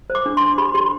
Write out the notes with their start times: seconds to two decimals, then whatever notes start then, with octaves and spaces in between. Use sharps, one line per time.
0.10 C5
0.15 D6
0.26 D4
0.37 D4 C6
0.58 G4 B5
0.74 G4 C6